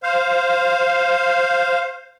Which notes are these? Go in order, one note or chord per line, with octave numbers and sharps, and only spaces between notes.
C5 F5